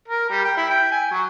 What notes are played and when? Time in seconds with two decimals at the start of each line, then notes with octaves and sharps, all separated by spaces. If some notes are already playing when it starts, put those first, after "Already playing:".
0.08 A#4
0.29 G3
0.44 G5
0.57 E4
0.69 G5
0.91 G#5
1.11 F#3